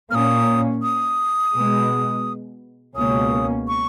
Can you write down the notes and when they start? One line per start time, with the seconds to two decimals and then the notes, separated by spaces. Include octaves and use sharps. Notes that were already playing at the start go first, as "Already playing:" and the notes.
0.11 A#2 A#3 C#4 D#6 F6
0.83 D#6
1.54 B2 G#3 B3
2.96 C#2 B2 A#3 C#4 D#6
3.68 C#6